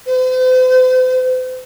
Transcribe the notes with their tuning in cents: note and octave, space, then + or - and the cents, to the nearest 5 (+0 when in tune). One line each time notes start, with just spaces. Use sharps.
C5 -45